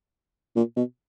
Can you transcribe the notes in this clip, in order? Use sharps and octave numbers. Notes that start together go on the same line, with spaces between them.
A#2
B2